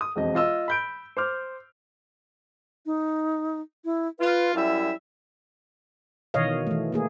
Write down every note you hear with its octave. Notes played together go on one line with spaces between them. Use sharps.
D#6
E1 F2 D#5
F4 D#5 E6
B5 G6 D7
C5 D6 F6
D#4
E4
F4 B4
F#2 G3 E4 E5
B2 D#3 E3 C#5 D#5 F5
E3 A3
A3 A#3 G#4